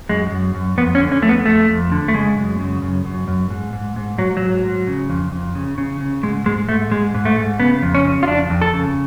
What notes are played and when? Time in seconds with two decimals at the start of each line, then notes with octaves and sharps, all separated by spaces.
0.09 F#2 G#3
0.31 F#2
0.55 F#2
0.78 F2 B3
0.95 C#4
1.00 D3
1.12 C#4
1.22 F2 A3
1.29 B3
1.46 F2 A3
1.69 F2
1.92 D3
2.08 A3
2.14 C#3 G#3
2.37 F#2
2.59 C#3
2.82 F#2
3.05 F#2
3.28 F#2
3.50 G#2
3.73 G#2
3.96 G#2
4.18 G#2 F#3
4.37 G#2 F#3
4.64 G#2
4.87 C#3
5.10 F2
5.32 F2
5.55 C#3
5.78 C#3
6.01 C#3
6.23 G#2 G#3
6.46 G#2 G#3
6.69 G#2 A3
6.91 G#2 G#3
7.14 G#2
7.25 A3
7.37 G#2
7.60 C#3 B3
7.83 F2
7.95 C#4
8.05 C#3
8.23 F4
8.28 F2 D4
8.50 F2
8.62 A4
8.73 C#3